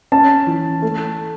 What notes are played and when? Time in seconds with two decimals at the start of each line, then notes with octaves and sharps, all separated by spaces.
0.12 C#4 A5
0.47 E3
0.82 A3